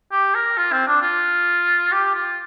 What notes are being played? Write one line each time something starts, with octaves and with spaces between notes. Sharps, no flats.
G4
A#4
F4
C4
D4
F4
G4
F4